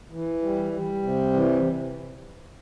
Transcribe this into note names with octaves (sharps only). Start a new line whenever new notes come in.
E3
G3
G3
C3
E3